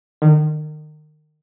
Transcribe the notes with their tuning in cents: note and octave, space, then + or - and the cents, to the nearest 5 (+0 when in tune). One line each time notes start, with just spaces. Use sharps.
D#3 -30